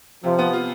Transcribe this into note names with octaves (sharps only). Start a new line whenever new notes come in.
C3 F3
B3
F4